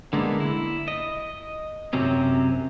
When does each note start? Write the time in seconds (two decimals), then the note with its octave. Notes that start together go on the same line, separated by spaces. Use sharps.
0.13 D3 G#3 A#3 B3
0.40 E4
0.88 D#5
1.93 F#2 C3 F#3 C4 C#4